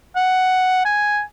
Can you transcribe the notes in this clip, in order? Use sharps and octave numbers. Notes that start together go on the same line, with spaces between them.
F#5
G#5